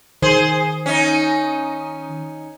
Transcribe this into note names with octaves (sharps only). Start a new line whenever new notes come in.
D#3 G#4 C5
C#4 D#4